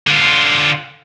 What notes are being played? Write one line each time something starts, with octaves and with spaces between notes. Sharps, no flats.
D3 F4